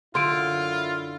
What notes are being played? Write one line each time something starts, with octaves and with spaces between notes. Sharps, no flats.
F#2 D3 E4 F4 C6 D7